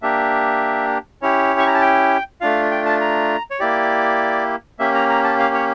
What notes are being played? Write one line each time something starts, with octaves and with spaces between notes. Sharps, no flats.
A#3 D4 G4 E5
C#4 E4 G4 C#5
C#6
A#5
A5
G5
A3 D4 F4 F5
G5
A5
A#5
C#5
A#3 E4 G4 D5
A#3 C#4 G4 E5
A#5
A#5
A5
F5
C#5